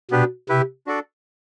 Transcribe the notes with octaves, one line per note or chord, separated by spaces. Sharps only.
B2 B3 D4 G4 B4
C3 E4 G4 B4 E5
D4 F#4 A4 D5